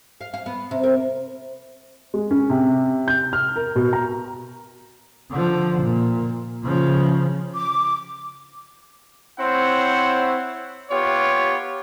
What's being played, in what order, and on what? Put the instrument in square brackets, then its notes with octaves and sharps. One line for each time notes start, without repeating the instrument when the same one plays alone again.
[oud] F5
F5
B3
C3
A#4
[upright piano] G#3
C#4
C3
G6
F6
A#4
B2
A#5
[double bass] D3 F3
A#2
C#3 F3
[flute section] D6
[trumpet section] C4 E4 C5 C#5 F#5
B3 F4 G4 C#5